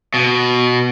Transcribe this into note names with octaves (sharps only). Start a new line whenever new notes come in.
B2